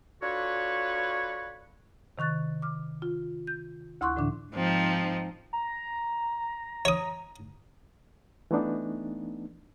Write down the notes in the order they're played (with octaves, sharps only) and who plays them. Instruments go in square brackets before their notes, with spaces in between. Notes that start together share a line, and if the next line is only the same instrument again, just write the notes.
[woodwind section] D4 F4 F#4 A4 B4 C#5
[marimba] C3 D#3 C#6 F#6 A6
D6 F6
F4
G6
D2 E4 C6 C#6 F#6
A2 D3 E3 D4
[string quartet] G#2 F3 C4 D#4
[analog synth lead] A#5
[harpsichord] C#5 D#6
[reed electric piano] E3 A3 B3 D4 D#4